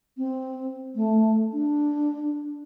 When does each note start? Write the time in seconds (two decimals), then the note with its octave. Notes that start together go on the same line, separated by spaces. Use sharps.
0.17 C4
0.96 A3
1.53 D4